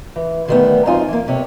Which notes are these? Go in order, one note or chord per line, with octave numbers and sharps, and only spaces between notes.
E3
D3 D#3 F#3 G3 A3 B3
F#2 C4 D#4 F4 G#5
E3 A#3
G2 C3 C#5